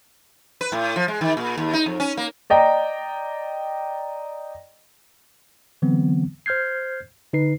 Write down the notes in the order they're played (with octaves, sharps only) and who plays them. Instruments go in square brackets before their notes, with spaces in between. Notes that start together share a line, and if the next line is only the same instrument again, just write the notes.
[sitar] B4
A2
F3
G#3
D#3
A#2
D#2
D#4
F2
C#4
A#3
[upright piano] D5 D#5 G5 A#5
[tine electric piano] D3 E3 F#3 B3 C4
C5 F6 G6 G#6 C7
D3 D#4 B4 C7